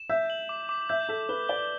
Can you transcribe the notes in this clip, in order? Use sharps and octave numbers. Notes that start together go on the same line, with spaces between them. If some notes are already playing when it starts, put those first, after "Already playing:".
Already playing: E7
E5 G6
F#7
D6
D6
E5 G6
A4 B6
B4 G7
D5 G7